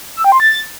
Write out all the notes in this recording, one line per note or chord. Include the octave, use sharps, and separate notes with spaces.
E6
G5
C6
A6